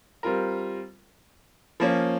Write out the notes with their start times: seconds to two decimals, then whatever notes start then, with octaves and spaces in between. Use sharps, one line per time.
0.23 G3 C4 F4 A#4
1.80 F3 A#3 C#4